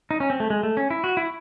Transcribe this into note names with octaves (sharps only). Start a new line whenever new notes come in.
D#4
C#4
C4
A3
G#3
A3
C#4
E4
F#4
E4